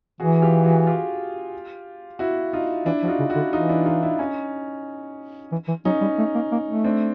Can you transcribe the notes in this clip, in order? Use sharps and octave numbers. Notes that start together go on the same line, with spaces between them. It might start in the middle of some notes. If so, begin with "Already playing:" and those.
E3 F#4 G#4
F4 G4
F#4 G#4
F4 G4
E4 F#4
D#4 F4
E3 D4 E4
F3 F#4
D#4 F4
C#3
E4 F#4
D3
E3 D#4 F4
D4 E4
D#4 F4
D4 E4
C#4 D#4
E3
E3
F#3 C#4 D#4
G3
A3
A#3
A#3
A3
C4 D4